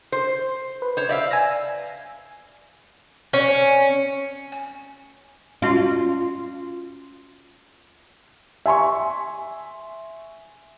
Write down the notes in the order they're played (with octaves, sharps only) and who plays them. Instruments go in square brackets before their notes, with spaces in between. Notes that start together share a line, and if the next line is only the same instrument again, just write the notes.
[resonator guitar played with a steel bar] C5
[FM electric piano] B4
[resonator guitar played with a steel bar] C5 C#5
D5 E5 F5
[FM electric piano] G#5 E6 A#6
[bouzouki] C#4
[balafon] G#5
[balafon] C#4 F#4 [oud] F4
[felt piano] E5 G#5 C6 C#6